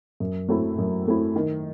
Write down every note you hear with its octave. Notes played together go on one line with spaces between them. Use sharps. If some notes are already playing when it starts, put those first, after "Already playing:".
F#2
F#3 A3 C4 E4
F#2
F#3 A3 C4 E4
D#3